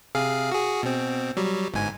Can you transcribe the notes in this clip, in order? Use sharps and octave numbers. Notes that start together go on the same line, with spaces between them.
C3 G#4 F5
F#4 G#4
B2 C4
F#3 G3
G1 G#2 G#5